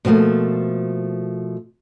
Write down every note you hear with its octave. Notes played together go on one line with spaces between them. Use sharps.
B2 F3 G3 A3 A#3